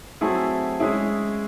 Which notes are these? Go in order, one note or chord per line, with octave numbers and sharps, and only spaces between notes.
F#3 A3 C4 E4 G#4
G#3 C#4 E4 G#4